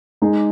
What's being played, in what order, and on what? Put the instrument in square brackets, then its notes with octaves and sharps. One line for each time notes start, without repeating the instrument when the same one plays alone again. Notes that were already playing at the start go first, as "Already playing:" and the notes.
[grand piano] G#3 D#4 G#4